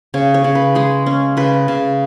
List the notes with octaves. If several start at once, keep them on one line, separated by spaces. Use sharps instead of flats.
C#3 C#5
C#5
C#3
B4
G#3 G#4
C#4
C#3 B4
C#3